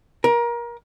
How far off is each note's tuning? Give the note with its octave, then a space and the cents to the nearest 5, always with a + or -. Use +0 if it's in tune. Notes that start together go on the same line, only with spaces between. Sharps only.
A#4 +25